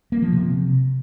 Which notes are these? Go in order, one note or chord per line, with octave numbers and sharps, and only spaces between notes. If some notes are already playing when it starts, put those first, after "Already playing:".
A#3
F3
C3